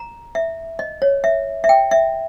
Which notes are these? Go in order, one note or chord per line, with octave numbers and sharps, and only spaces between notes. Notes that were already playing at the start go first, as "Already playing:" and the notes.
Already playing: A#5
E5
D#5
C#5
E5
E5
G5
E5